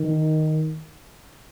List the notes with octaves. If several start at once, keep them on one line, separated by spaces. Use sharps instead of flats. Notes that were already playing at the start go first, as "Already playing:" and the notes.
Already playing: D#3